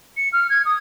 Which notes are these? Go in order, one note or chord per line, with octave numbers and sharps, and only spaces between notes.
C#7
F6
G#6
D#6